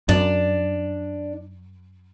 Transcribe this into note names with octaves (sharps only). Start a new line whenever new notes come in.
F#2 D4 D5